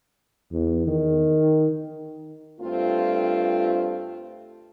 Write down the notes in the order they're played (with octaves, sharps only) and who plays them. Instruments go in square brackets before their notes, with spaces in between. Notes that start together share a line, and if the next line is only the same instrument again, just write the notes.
[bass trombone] E2
D#3
[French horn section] G2 A3 C4 F4